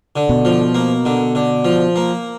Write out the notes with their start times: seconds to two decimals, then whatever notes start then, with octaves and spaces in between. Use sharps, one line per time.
0.16 D3
0.29 B2
0.45 F3
0.74 A#3
1.05 D3
1.35 D3
1.65 F3
1.96 A#3